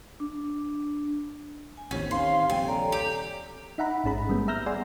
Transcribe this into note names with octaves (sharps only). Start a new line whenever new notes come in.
D4
G#5
A1 D#2 C4 C#4 G4 C5 C#5
D#3 F5 C6
D#1 A#1 C3 G5 G#5
A4 C#5 D5 A#5
G4
D#4 E5 F#5 A#5 B5
A1 G#2 C#4 G#4 B5
G3 G#3 A#3 B3
E5 A#5 E6 F6 G6 A#6
G#4 D5 F#5 G#5 C6